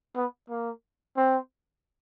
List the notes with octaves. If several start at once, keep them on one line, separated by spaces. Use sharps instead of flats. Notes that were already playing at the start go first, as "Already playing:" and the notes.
B3
A#3
C4